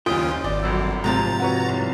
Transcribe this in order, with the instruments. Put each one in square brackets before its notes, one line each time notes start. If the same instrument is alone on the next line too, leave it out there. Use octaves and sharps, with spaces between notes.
[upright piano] F#1 D#6 [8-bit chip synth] D#2 C#4 F4 [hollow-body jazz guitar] G5
[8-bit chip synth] G#1 [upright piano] D5
[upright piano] G1 F#2 E6
[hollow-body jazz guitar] G#2 C3 F3 [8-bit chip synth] A#5 A6
[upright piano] F#4 B4 C#5
C2